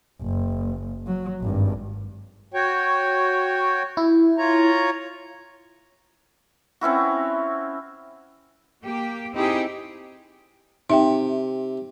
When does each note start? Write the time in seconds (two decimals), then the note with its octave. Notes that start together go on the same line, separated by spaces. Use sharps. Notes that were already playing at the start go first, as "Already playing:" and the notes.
0.22 F#1
1.07 F#3
1.41 G#1 G2
2.54 F#4 C#5 G5
3.97 E4
4.38 F4 C#5 A#5
6.81 C4 C#4 E4 F#4
8.82 A#3 G4
9.34 C4 D#4 E4 G4 G#4
10.90 C3 D#4 E5 G5